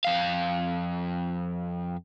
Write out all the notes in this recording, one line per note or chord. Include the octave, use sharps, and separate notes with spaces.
F2 F5